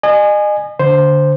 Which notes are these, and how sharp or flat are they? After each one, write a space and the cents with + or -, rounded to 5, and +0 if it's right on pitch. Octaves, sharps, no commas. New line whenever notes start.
D#5 -35 G#5 +0
D3 +0 C5 +0